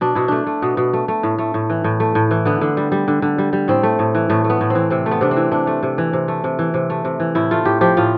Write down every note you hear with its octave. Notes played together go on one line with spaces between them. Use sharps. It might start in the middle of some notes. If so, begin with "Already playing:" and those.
B2 D4
B2 E4
A3 D4
A3
B2 B3
B2
A3
A3
A2
A3
A2
E3
A2
A3
A2
E3
D3 B3
D3
G3
G3
D3
D3
G3
G3
A2 C4
A3
A2
E3
A2 A3
A3
B3
A2
C4
E3
C3 C4
A3
B3
C3 D4
C4
E3
C3 D4
A3
C3
E3
C3
A3
C3
E3
C3
A3
C3
E3
A2 E4
A3 F4
A2 G4
F3 G4
A2 F4